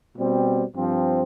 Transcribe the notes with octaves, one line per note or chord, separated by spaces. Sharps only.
B2 G3 C4
G2 F3 C4